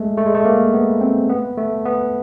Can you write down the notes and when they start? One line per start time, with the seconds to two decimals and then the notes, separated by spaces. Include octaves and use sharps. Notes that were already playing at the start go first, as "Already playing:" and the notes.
Already playing: G#3 A3
0.18 A3
0.26 G#3
0.35 A3
0.45 A#3
0.74 B3
1.01 C4
1.29 B3
1.57 A3
1.85 B3